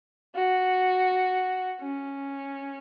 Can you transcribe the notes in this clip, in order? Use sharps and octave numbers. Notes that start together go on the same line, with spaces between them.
F#4
C#4